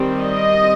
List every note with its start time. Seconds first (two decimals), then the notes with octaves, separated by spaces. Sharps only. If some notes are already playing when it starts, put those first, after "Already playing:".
Already playing: D#3 G3 C4
0.20 D#5